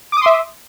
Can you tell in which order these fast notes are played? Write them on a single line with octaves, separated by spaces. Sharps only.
D6 D#6 C6 E5